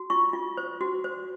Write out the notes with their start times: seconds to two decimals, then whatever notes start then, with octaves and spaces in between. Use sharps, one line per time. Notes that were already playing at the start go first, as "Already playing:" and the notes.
Already playing: F#4
0.10 F4 C#6
0.33 F4
0.57 C5
0.81 F#4
1.04 C5